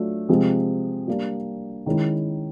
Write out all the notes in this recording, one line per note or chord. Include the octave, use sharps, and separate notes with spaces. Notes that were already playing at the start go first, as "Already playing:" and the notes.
Already playing: F#3 A3 D4 F4
C3 F3 G#3 C4
G3 A#3 D4
D#3 G#3 C#4 E4